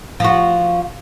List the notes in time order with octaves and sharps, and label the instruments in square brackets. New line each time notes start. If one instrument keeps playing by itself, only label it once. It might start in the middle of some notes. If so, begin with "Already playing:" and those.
[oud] F3 F#4